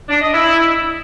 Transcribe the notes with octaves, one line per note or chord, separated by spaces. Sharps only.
D4
D#5
E4